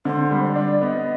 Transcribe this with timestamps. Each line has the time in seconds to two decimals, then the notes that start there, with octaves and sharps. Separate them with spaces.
0.05 D3 C5
0.31 G3
0.44 D#5
0.47 D5
0.56 D4
0.82 B3 D#5